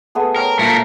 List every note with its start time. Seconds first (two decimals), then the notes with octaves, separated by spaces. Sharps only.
0.15 A3 B3 G#4
0.36 A#4 C5 C#5 G5
0.59 A#2 A3 A#4